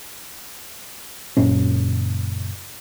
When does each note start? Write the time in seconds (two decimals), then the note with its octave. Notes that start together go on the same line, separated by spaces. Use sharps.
1.37 F#1 A#2 C#4